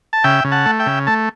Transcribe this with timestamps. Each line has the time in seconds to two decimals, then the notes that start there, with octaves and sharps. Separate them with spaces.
0.13 A5
0.24 C#3 E5 G5
0.44 C#3
0.52 F#5 A5
0.66 A3
0.80 E5 G5
0.86 C#3
1.07 A3 A5